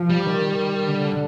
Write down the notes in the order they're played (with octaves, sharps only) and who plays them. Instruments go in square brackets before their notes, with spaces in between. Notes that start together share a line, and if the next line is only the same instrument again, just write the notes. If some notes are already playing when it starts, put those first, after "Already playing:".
Already playing: [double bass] F3
[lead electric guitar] G3
[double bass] D#3
D3